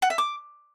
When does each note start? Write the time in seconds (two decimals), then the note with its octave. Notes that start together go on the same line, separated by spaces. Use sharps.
0.02 F#5
0.10 E5
0.18 D6